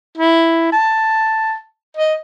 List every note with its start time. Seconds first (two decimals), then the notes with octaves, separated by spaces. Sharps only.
0.18 E4
0.72 A5
1.97 D#5